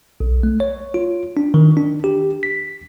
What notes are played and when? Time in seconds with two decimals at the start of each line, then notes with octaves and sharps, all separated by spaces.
0.20 B1
0.43 A3
0.60 C#5
0.94 F4
1.37 D4
1.54 D#3
1.77 D4
2.04 G4
2.43 B6